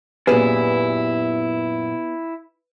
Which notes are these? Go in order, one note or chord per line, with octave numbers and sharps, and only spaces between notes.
F#2 A#2 B3 E4 G4 G#4 B4